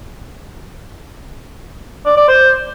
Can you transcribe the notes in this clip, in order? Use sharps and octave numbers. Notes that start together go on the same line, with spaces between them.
D5
D5
C5